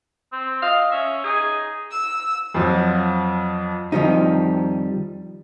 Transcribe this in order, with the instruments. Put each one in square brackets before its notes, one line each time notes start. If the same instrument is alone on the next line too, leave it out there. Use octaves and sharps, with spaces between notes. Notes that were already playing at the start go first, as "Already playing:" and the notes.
[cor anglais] C4
[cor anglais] D#5 [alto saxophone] F5
[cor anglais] C#4 [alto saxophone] E5
[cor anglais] D#4 [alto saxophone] G#4
[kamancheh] E6
[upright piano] F2 F3 F#3
[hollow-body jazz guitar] F2 B2 D#3 F3 G3 D#4